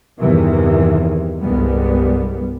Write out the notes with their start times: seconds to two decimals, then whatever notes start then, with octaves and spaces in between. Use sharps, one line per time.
0.19 E2 G2 C3 D#3 E3
1.40 C2 G2 G3 G#3 B3